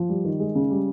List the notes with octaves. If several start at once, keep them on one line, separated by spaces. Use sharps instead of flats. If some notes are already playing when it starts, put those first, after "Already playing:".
Already playing: F3
G3
D#3
G#3
C#3
G3